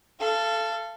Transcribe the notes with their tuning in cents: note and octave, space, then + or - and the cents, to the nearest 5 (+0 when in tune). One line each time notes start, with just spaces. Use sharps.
A4 +0 F5 -30